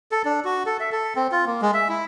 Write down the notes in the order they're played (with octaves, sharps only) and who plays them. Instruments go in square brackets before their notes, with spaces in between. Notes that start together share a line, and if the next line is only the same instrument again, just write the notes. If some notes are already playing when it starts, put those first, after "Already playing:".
[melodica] A4
D4
F#4
A4
E5
A4
C4
F4
A#3
G#3
E5
E4